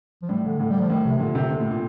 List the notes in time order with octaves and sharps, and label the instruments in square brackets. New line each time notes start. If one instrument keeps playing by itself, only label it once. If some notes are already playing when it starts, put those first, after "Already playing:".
[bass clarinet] F3
[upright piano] A2 [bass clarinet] G3
[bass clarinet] D3
[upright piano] A2 [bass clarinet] D3
[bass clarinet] G3
F3
[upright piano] A2 [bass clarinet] D#3
[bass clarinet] C3
[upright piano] A#2 [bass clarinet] D3
[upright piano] C3
A#2
A2
A#2